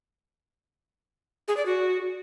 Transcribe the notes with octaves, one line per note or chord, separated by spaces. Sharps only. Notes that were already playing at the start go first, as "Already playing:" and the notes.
G#4
D5
F#4